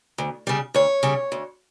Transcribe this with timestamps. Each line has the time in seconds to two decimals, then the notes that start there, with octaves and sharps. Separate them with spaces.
0.18 D2
0.47 C#3 G3
0.74 D2 C#5
1.03 C#3 G3
1.32 D2